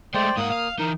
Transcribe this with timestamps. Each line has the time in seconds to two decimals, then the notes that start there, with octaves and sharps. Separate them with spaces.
0.14 G#3 A3 C5 D5 G5
0.37 G#2 A#3 F#5 D#6
0.51 F5
0.79 E3 D#4 A#4